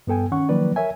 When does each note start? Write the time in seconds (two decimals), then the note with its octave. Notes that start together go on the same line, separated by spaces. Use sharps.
0.07 G2 B3 A4 G5 G#5
0.32 D#3 C#4 F#5 C#6
0.49 D#3 F3 F#3 A#3 B4 D5
0.76 A#4 C#5 E5 G#5